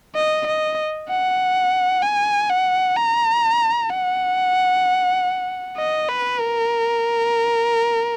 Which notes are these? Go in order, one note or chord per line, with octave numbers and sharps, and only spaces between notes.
D#5
D#5
F#5
G#5
F#5
A#5
F#5
D#5
B4
A#4